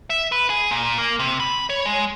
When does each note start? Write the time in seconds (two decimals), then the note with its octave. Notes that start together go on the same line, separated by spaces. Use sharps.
0.10 E5
0.32 B4
0.50 G#4
0.71 A#2
0.98 A#3
1.19 C3
1.40 B5
1.70 C#5
1.86 G#3